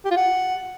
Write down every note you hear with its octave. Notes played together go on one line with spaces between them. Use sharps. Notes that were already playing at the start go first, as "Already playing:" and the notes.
G4
F4
F#5